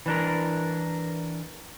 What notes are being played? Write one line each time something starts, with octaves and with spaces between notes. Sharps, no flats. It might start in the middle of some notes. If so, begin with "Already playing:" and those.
E3 D4 A#4